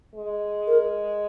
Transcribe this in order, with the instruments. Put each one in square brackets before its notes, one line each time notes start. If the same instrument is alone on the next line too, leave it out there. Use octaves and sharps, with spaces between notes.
[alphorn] G#3
[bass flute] A#4